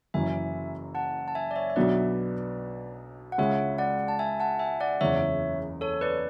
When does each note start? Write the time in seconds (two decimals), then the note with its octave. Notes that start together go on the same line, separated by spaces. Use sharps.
0.14 F#1 F#2 E3 E5 G#5
0.95 F#5 A5
1.28 A5
1.35 E5 G#5
1.51 D5
1.56 C#5 E5
1.70 E5
1.76 B1 B2 F#3 B3 D4 B4 D5
3.32 F#5
3.38 C#2 C#3 G#3 C#5 E5
3.78 D5 F#5
4.08 A5
4.19 E5 G#5
4.40 F#5 A5
4.59 E5 G#5
4.80 D5 F#5
5.01 F#1 E2 C#3 C#5 E5
5.81 A4 C#5
6.01 B4 D5